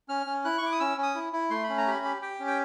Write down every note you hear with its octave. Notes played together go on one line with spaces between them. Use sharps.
C#4 F6
C#4
E4 F#6
C#6
E4 D6
D#6
C#4 E6
C#4
D#6
E4
E4
A3 C6
B5
C#4
A#5
G4 B5
G4
G4 G5
C#4
G5